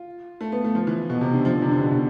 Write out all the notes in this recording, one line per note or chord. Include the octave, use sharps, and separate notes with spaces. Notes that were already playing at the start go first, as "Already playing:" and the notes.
Already playing: F4
A3
B3
A3
F3
E3
B2
C3
D3
F3
D3
C3
D3
B2
B2